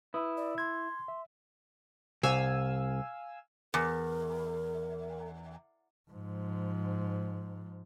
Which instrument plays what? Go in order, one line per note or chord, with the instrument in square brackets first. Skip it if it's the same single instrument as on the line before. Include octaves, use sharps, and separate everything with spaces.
[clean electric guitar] E4 [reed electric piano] B4 D#6
[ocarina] D5
[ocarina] C6 [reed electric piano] G#6
[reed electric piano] E5
[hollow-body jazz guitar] C2 [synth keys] F5 G#5 E6
[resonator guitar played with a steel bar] E2 [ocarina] A#4
[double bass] G#2 F3